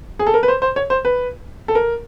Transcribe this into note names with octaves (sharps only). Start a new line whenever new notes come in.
G#4
A4
A#4
B4
C5
C5
C#5
C5
B4
A4
A#4